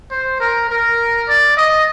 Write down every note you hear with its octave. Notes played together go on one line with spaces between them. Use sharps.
C5
A#4
A#4
D5
D#5